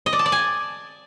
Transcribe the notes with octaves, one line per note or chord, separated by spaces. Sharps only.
D#5
D5
A5
D5
G#5